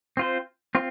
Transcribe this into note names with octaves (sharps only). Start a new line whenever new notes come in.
C4 F4 C5
C4 F4